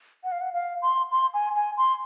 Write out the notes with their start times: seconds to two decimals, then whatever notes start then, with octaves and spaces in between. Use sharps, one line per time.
0.24 F#5
0.32 F5
0.41 F#5
0.54 F5
0.82 C6
1.12 C6
1.34 G#5
1.56 G#5
1.77 C6